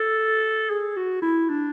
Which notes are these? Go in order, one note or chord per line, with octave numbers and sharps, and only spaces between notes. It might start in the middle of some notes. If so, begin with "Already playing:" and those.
Already playing: A4
G#4
F#4
E4
D4